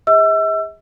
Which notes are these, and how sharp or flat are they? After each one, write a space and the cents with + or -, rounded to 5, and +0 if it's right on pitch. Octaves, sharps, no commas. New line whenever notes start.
G#4 -35 E5 -45 E6 +30